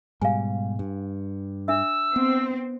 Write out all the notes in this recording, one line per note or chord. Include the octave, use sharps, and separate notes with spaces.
G#2 B2 G3 F5 G#5
G2
D4 E5 E6
B3 C4